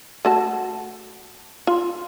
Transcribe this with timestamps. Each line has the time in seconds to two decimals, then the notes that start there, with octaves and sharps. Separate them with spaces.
0.25 A3 F#4 A5
1.67 F4